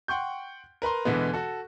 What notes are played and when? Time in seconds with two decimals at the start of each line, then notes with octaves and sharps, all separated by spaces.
0.08 F#5 G5 C6 C#6 G6
0.82 A#4 B4 A#5 C6
1.05 E2 B2 D3 E3 G#3 B3
1.33 F#4 A4